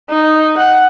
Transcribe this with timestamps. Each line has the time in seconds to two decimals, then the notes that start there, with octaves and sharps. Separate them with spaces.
0.10 D#4
0.58 F#5